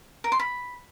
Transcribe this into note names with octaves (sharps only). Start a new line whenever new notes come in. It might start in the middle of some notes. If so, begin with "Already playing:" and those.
A#4
C6
B5